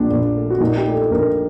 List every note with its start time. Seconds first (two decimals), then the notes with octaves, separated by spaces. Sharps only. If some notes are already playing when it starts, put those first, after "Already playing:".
Already playing: A#1 A#2 D4
0.10 A#1
0.36 A3
0.50 F#4
0.60 A#2 D#4
0.77 G4
0.86 A3
0.94 A4
1.11 A#1 A#4